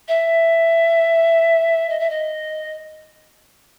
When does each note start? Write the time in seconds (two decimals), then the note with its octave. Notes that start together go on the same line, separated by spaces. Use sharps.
0.08 E5
1.89 D#5
1.99 E5
2.09 D#5